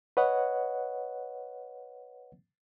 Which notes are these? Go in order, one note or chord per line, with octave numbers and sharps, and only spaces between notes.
B4 C#5 D#5 F#5